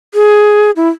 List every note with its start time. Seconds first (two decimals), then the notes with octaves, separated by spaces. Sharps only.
0.14 G#4
0.76 E4